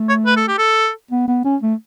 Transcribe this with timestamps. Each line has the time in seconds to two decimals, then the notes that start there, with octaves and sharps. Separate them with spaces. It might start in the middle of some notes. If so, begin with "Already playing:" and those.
Already playing: A3
0.09 C#5
0.26 B4
0.37 A4
0.48 G4
0.58 A4
1.11 B3
1.28 B3
1.45 C#4
1.62 A3